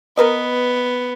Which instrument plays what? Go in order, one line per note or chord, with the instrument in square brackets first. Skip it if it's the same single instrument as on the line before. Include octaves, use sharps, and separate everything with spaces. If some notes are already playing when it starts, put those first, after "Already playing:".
[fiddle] B3 [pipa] A#4 B4 D#5